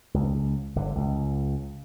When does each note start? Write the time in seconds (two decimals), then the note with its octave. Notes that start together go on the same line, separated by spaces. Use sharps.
0.14 C#2
0.76 G1 D3
0.95 C#2